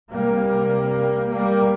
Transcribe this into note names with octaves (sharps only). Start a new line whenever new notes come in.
C2 C3 G3 A#3
G3 A#3